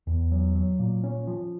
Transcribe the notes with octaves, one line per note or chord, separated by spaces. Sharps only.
E2
F#3
F#3
A#2
C#4
F3